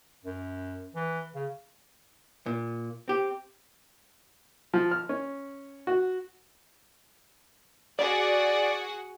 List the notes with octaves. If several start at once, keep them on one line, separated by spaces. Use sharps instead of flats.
F#2
E3
C#3
A#2
C4 G4
F3
F6
C#4
F#4
F#4 G#4 D5 F#5